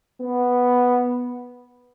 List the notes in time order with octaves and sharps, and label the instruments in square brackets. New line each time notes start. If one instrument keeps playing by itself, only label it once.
[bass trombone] B3